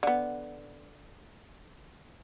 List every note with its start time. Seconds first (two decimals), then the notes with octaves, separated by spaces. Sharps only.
0.03 D3 B3